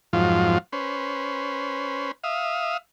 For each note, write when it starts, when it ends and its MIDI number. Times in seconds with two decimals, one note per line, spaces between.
0.13 0.58 41
0.13 0.58 44
0.13 0.58 53
0.13 0.58 54
0.13 0.58 65
0.72 2.11 61
0.72 2.11 71
0.72 2.11 72
2.24 2.77 76
2.24 2.77 77
2.24 2.77 87